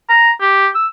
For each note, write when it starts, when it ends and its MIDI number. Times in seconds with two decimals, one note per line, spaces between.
0.09 0.31 82
0.41 0.68 67
0.75 0.87 88